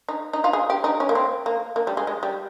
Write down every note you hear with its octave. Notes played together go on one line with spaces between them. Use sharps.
D#4
D#4
F4
G#4
G4
D#4
C#4
A#3
C4
A#3
A#3
G3
G#3
G#3
G3